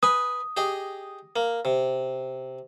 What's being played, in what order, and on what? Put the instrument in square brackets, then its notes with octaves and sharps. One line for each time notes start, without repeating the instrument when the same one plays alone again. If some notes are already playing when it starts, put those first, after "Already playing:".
[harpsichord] B4 G#5 B5 [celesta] D#6
[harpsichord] G4 G#4 D#5
A#3
C3